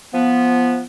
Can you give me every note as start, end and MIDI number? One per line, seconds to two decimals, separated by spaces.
0.14 0.82 53
0.14 0.82 59